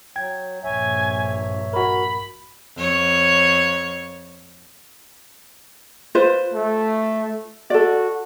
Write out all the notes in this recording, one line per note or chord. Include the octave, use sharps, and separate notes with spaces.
F#3 G5 G#6
A#1 G2 C#5 E5 G#5
F#4 A#4 B5
F2 C#5
F4 B4 C5
A3
F#4 A4 D5